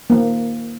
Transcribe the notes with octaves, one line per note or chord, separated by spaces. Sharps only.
A#3